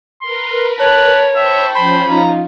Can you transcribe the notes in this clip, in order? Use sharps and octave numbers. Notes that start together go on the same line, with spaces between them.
A#4 B4 C6
C#5 A5 B5 F#6
C5 E5 G5 A5 B5 C#6
F3 C#4 C5 B5
D#4 F4 A#5